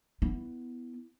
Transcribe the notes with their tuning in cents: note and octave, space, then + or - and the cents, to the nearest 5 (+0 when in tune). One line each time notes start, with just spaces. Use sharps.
B3 +5 E4 +0